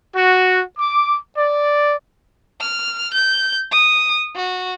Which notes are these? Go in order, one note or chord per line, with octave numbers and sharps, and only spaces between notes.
F#4
D6
D5
F6
G6
D#6
F#4